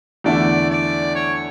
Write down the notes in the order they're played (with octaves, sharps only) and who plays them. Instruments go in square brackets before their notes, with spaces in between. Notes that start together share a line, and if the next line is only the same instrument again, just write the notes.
[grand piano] E2 D3 A3 E4 [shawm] D5
[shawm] D5
C#5